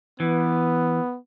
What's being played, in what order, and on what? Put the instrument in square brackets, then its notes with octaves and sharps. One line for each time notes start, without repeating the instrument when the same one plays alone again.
[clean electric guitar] E3 [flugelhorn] B3